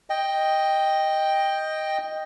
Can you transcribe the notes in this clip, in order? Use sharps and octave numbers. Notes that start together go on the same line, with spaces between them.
D#5 G5